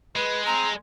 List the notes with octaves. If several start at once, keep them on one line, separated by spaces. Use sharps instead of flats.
G#3 B4
C4 A#5